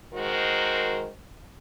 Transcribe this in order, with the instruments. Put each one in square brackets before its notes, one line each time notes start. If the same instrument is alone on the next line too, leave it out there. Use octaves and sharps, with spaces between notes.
[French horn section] D#3 G#3 F#4 A#4 C5